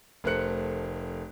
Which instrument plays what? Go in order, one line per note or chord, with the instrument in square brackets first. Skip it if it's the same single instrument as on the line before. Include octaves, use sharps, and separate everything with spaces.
[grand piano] F1 A3 A#4 C5 F#6 C#7